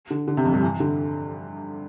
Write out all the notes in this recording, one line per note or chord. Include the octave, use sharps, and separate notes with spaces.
D3
D3
C3
F2
G2
E3
D3